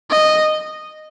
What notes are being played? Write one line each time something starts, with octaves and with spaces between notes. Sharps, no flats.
D#5